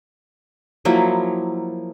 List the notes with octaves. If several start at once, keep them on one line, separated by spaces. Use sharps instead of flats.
F3 F#3 A#3 E4